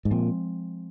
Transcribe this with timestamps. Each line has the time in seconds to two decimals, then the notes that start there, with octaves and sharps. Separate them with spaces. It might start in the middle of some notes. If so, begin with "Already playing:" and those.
0.05 G#2
0.11 A#2 F3 G#3 C4